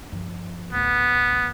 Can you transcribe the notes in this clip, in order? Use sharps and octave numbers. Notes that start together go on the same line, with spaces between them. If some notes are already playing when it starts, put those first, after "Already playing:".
G2 F3
D1 A1 B3